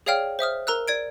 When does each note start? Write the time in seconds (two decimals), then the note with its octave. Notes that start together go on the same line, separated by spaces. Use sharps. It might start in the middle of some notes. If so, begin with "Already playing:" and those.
0.06 G#4 C#5 D5 F5 G5 F6
0.39 C5 E5 D#6 F6
0.67 A#4 A#5 E6 F#6
0.88 D5 G#6 D7